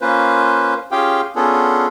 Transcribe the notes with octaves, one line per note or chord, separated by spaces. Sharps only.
A#3 C#4 F4 B4 C5
C#4 F4 G4 G#4 F5 G5
B3 C#4 D4 F4 G#4 A4